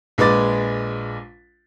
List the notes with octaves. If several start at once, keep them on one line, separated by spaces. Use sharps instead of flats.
A#1 G#3 B4 D6 A6